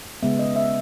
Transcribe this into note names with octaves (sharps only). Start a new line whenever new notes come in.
C#3 G#3 B3 E5
D#5
E5